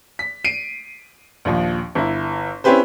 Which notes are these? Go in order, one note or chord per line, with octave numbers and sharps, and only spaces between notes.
B6
C7 D7 D#7
A#1 D#2 F3
G1 E4
C4 C#4 E4 G4 B4 C5